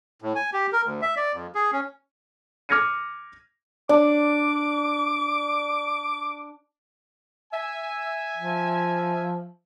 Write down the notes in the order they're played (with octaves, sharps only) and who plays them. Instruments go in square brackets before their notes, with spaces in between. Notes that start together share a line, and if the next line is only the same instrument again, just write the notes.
[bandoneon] A2
G#5
G4
A#4
D2
E5
D5
F2
G#4
C#4
[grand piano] D6 F6 G#6 A#6 C#7 D#7
[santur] D4 [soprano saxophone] D6
[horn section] E5 G#5
[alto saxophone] F3